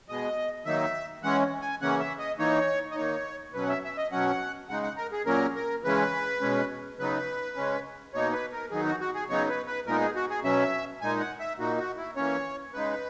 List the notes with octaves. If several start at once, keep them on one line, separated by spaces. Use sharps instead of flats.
B2 G#3 B3 D#5
D#3 F#3 A#3 D#4 E5
E3 G#3 C#4 F#5
G#5
C#3 E3 A#3 C#4 F#5
E5
D#5
E3 A#3 D#4 C#5
D#5
D#3 A#3 D#4 C#5
B2 F#3 C#4 B4
F#5
E5
E5
D#5
B2 F#3 C#4 F#5
C#3 G#3 D#4 F#5
F#5
A#4
G#4
A#2 F#3 A#3 C#4 A#4
A#4
C#3 E3 G#3 C#4 B4
B2 G#3 C#4
C#3 F#3 B3 D#4 B4
C#3 G#3 C#4
B2 A#3 D#4 C#5
B4
A#4
D#3 F#3 B3 D#4 G#4
F#4
F#4
G#4
C#3 F#3 B3 D#4 C#5
B4
B4
A#2 G#3 B3 D#4 A#4
G#4
F#4
G#4
B2 F#3 C#4 E5
A#2 G#3 D#4 G#5
F#5
E5
A#2 A#3 D#4 F#4
F#4
E4
E3 A#3 C#4 C#5
C#3 G#3 D#4 B4